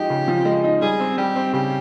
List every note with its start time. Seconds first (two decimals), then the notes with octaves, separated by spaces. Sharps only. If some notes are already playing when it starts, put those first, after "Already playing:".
Already playing: F3 G#3 D#4 G4
0.10 C#3
0.28 F3
0.45 G#3
0.64 D#4
0.82 G3 G#4
1.00 C4
1.18 G3 G4
1.35 C4
1.53 C#3 G4